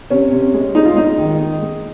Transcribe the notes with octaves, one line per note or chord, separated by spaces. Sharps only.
C3 C#4
C3
G#3
G#3 D#4
F4
G#3 D#4
D#3
G#3
G#3